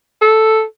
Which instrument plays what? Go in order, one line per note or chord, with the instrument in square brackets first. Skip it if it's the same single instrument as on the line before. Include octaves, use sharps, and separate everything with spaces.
[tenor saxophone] A4